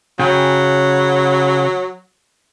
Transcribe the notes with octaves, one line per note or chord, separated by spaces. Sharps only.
C#3 F#3 G5 G#5